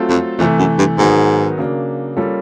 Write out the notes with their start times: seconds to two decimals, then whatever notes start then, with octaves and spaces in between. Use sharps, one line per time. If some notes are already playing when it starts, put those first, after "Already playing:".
Already playing: F#3 A3 C4 F4 A4
0.09 F2
0.39 F2 C3 E3 A3
0.58 F#2
0.78 G2
0.98 G#2 D#3 F#3 B3 D#4
1.58 C#3 F#3 A#3 D4
2.16 G3 A#3 C#4 F4 A4